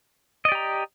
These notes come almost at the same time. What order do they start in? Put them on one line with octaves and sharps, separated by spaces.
D#5 D5 G4 A#5